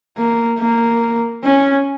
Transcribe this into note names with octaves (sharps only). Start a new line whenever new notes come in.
A#3
A#3
C#4